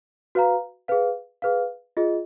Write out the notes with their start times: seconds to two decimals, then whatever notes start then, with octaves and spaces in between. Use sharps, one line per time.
0.35 F#4 B4 F5 A#5
0.88 G#4 B4 F5
1.42 G#4 B4 F5
1.97 F4 G#4 D#5